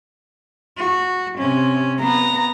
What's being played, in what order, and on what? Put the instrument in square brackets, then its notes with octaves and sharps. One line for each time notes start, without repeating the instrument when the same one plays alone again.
[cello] F#4
C3 C#4
[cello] B3 [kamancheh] A#5